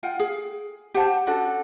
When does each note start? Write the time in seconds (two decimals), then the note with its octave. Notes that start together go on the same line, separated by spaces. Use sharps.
0.03 F4 F#5 G5
0.19 G#4
0.94 G4 C5 F#5 A5
1.27 C#4 D4 F#4 A4